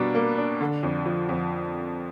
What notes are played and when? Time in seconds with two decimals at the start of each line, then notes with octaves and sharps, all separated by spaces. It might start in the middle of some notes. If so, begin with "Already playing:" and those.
Already playing: B2 G3 A#3 D4
0.15 A#3
0.37 D4
0.61 D3
0.83 F2
1.06 F3
1.29 F2